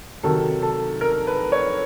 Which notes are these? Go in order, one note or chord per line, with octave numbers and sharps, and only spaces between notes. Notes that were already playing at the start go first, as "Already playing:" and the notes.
C3 D#3 F#3 A4
A4
A#4
B4
C#5